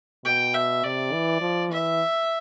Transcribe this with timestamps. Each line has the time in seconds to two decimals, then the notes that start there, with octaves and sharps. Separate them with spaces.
0.25 B2 G5
0.54 E5
0.84 C3 D5
1.13 E3
1.41 F3
1.71 E3 E5